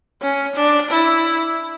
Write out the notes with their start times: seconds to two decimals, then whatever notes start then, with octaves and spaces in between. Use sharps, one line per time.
0.22 C#4
0.56 D4
0.91 E4